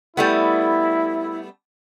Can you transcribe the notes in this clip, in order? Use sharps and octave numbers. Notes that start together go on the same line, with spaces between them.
G3 A3 B3 E4